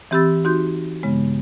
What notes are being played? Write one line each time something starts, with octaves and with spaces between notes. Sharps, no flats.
E3 C4 G4 B5 E6 A6
D#4 F#4 C6 G6
G2 C#3 G#3 B3